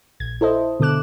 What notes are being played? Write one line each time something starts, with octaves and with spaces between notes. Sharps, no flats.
A#1 G#6
E4 A4 C5 D#5
B2 D3 A4 D6 F#6 E7